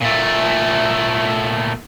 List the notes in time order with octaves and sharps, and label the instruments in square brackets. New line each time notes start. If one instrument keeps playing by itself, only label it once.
[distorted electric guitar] A#2 A3